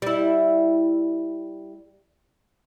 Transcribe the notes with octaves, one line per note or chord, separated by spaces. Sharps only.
G3 E4